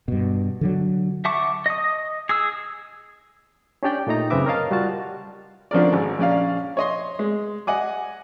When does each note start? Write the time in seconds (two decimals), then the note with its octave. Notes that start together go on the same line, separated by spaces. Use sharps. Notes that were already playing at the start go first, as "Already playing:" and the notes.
0.08 G2 B2
0.61 D3 D#3 F#3
1.25 E5 F#5 A5 C#6 D6
1.66 D#5 D#6
2.29 G#4 D#6 E6
3.83 C#4 D4 G4 D5 G5
4.07 A#2 A3 D#4 A#5
4.30 F#2 C#3 C4 B4 E5 D6
4.46 A#4 C#5 D#5 F5 A5
4.71 G3 F4 F#4 A5
5.71 D3 F3 C#4 A#4 D5
5.93 G#1
6.19 A#1 C#4 D5 F5
6.77 C#5 D#5 C6
7.19 G#3
7.67 D#5 F#5 G#5 D6